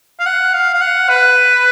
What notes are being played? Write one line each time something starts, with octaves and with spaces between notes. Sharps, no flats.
F5
F#5
F5
F5
F#5
B4